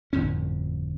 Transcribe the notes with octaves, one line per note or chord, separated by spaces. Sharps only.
G1 F2 A2 C#4